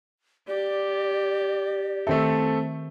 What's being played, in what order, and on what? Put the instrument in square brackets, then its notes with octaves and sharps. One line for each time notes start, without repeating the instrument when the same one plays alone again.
[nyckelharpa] G4 [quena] D5
[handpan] D#3 E5 [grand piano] A3 C4 A4